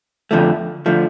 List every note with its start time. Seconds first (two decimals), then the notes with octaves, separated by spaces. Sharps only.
0.31 F2 D3 F3 A3
0.86 D3 F3 A3